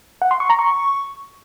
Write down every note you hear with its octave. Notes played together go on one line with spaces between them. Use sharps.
F#5
C6
C#6
A#5
C#6